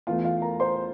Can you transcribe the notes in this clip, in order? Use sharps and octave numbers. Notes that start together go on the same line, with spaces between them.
E2 E3 A3 F4 F5
F4 F5
A#4 A#5
C5 C6